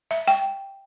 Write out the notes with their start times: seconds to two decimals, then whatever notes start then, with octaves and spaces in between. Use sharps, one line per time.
0.11 E5
0.28 G5